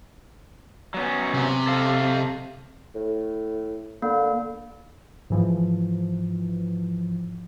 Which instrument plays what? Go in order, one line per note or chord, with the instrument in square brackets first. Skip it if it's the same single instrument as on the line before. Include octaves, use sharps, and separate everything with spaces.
[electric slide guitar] F#3 B3 C#4
[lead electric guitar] C3
[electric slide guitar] A4 F5
[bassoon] A2
[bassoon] D3 [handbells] A#3
[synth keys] G#2 E3 F3